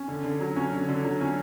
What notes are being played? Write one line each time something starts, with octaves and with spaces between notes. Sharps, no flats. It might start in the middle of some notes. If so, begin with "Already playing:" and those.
Already playing: C#4
D3
D3
F#3
C#4
D3
D3
F#3
C#4